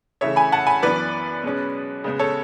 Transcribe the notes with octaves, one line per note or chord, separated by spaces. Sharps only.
C#3 E3 A3 C#5 E5
G#5 B5
F#5 A5
G#5 B5
F#2 E3 B3 B4 D5
B2 G#3 C#4
C#3 G#3 B3
A4 C#5